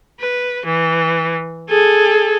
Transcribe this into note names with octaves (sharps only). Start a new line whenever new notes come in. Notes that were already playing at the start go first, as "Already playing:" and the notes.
B4
E3
G#4 A4